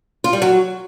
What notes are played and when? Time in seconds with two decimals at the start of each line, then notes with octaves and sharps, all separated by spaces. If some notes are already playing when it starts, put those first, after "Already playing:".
0.24 F4
0.33 G3
0.42 F#3